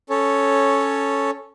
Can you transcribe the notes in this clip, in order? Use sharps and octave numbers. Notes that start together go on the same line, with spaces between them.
C#4 A4 C#5